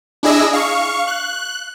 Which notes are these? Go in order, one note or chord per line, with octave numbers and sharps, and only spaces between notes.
D4 E4 G#4 D#5 E6
F5 C#6
F#6